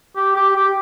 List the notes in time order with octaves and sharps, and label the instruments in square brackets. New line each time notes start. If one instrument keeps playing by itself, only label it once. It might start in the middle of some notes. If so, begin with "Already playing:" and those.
[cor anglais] G4
G4
G4